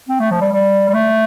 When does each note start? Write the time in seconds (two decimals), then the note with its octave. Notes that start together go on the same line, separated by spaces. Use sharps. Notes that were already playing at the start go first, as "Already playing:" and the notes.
0.09 C4
0.20 A3
0.31 F3
0.41 G3
0.52 G3
0.89 G3
0.94 A3